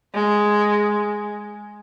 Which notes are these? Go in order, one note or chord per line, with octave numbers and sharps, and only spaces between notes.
G#3